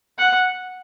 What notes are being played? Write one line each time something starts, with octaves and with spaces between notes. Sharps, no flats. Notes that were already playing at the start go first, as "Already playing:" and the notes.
F#5